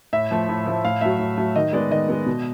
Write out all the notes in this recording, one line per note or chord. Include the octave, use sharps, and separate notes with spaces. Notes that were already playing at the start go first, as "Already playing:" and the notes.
A2 E5
F3 A3
A2
F3 A3
A2 F5
F#3 A3 E5
A2
F#3 A3
D#3 D#5
G#3 B3 D5
D#3 D#5
G#3 B3
B2